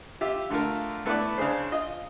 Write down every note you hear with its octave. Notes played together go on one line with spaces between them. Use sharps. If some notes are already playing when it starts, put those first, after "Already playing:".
F4 G4 E5
D3 A3 F4 A#4
A3 B3 E4 B4 D5
C#3 D4 G#4 C5
F4 D#5